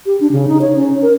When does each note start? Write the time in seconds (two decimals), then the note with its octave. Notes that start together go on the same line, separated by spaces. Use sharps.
0.06 G4
0.20 D4
0.32 C#3
0.48 D#4
0.61 C#5
0.76 C#4
1.02 A#4